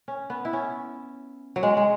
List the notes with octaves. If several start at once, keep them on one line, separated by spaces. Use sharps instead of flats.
C#4
B3
E4
C#4
F#3
G#3
G#3